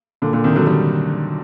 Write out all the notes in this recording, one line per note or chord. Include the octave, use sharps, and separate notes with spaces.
A#2 D3
A#2 D3
C3 D#3
D3 F#3
D#3 G3